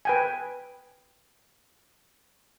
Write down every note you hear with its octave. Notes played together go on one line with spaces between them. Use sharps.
B4 G5 G#5